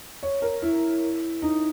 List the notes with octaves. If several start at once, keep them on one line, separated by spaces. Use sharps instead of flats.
C#5
A#4
E4
D#4